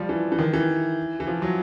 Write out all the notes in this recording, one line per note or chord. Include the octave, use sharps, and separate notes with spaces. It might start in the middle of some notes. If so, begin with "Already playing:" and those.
Already playing: F3 G3
E3
E3
D#3
E3
E3
F3
F#3